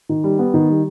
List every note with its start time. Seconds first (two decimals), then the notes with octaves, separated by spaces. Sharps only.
0.09 D#3
0.24 G3
0.39 B3
0.54 D#3
0.70 G3